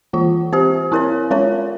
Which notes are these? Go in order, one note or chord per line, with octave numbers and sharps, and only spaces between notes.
E3 A#3 F4
C4 G4 C5
C4 E4 A#4 C#5
G#3 C#4 F4 A#4 C#5